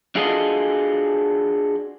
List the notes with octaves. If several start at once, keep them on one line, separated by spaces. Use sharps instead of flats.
D4 F4 F#4 G#4 A4 D#5